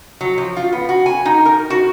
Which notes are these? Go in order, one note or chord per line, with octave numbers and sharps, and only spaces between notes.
F#3
F3
F4
B3
F#4
G#5
D#4
A#4
F#4